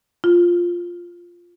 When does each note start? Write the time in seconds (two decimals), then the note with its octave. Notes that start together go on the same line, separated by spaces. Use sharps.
0.24 F4